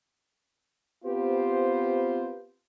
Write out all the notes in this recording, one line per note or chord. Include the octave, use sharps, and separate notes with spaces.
B3 C4 F4 G4 B4 C5